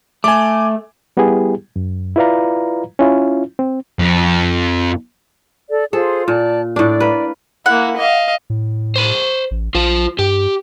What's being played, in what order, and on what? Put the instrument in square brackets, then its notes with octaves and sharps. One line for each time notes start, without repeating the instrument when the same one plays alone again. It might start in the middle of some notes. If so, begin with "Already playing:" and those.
[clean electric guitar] A3 [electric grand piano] G#5 D6
[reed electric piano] G3 B3 E4 G4 G#4
F#2
E4 F4 B4 D5 F5 A#5
C#4 E4 F4
C4
[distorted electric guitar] F2
[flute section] A4 D5
[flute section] F4 G#4 C5 [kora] A4
[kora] A#2 [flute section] D5 A5
[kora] A2 D4 [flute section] D5
[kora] A#3 B4
[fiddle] A#3 E4 [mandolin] F#5
[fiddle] D#5 F5
[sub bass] A2
[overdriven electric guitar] C5 B5
[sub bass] A1
[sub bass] A#1 [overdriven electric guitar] F4 C5
[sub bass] G2 [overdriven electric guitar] G4